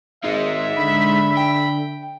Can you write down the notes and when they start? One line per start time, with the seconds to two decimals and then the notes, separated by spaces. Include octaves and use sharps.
0.24 G#1 G#3 D#4 E5
0.77 D3 B5
1.37 G5